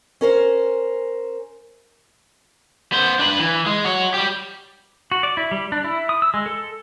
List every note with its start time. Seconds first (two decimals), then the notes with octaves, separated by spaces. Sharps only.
0.21 C#4 A#4 C5
2.92 B3 C5
3.19 D4 B4
3.40 E3
3.66 G#3
3.84 F#4 C#5
4.14 G3 G4
5.12 F#4
5.23 D5
5.37 E4
5.51 G3
5.72 D4
5.84 E4
6.09 D#6
6.22 E6
6.34 G#3
6.46 A4